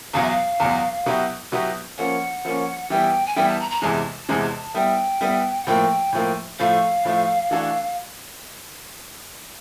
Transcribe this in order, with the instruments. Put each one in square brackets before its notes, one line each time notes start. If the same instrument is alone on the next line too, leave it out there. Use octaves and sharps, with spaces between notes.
[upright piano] E2 B2 F#3 [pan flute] F5
[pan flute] E5
F5
[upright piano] E2 B2 F#3
B2 F#3 B3 E4 G4
B2 F#3 B3 E4 G4
[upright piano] F3 A#3 C#4 [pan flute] F#5
[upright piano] F3 A#3 C#4
[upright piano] E3 G3 B3 E4 G4 [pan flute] G5
[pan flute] G#5
[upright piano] E3 G3 B3 E4 G4 [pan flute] G5
[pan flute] A5
A#5
A#5
[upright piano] E2 C3 E3 G#3 [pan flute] A5
[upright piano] E2 C3 E3 G#3
[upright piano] G3 B3 E4 [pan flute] G5
[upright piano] G3 B3 E4
[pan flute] F#5
[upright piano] A2 F3 A#3 [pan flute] G5
[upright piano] A2 F3 A#3
[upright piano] A2 F3 A3 [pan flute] F5
[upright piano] A2 F3 A3
E3 A3 D4 F#4 A4